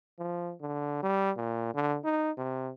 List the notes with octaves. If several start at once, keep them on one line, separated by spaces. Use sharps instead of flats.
F3
D3
G3
A#2
D3
D#4
C3